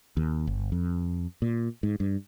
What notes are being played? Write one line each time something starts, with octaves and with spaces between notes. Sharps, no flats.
D#2
G1
F2
A#2
G#2
G2